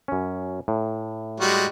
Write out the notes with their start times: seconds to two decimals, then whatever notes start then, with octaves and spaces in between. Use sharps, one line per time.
0.08 F#2 C#4
0.68 A2
1.40 G3 G#3 F#4